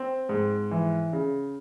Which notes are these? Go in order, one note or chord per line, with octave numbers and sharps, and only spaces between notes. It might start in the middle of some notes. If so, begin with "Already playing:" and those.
Already playing: C4
G#2
E3
C#3